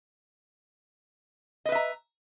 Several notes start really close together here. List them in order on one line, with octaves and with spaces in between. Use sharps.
D#5 B4 E5 A#5